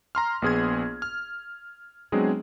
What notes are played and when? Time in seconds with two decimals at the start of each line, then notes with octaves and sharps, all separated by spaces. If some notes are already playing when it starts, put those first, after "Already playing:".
0.15 A#5 C6 F6
0.42 A#1 B3 G#4 C6 G#6
1.02 F6
2.12 F#3 G#3 B3 C4 D4 G#4